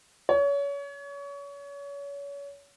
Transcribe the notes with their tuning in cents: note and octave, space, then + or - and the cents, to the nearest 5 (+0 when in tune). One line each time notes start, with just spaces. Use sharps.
C#5 +30